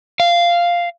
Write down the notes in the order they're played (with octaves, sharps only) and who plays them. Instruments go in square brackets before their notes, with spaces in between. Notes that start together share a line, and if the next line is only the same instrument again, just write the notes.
[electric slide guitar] F5